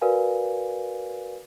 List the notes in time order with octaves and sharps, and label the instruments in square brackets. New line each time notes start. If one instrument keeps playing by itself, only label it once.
[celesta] F#4 A#4 B4 D5 F5 G#5